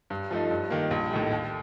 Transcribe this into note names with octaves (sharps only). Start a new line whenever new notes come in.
G2
F3 A3 D#4
G2
D#3 A#3
A#1
A2 A3 D#4 G4
D#2